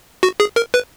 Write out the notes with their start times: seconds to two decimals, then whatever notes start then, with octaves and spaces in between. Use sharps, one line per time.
0.23 F#4
0.40 G#4
0.56 A#4
0.74 B4